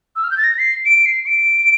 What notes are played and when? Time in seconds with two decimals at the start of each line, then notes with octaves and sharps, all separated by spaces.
0.16 E6
0.24 F6
0.31 G6
0.37 A6
0.44 A#6
0.59 C7
0.86 D7
1.06 C7
1.26 D7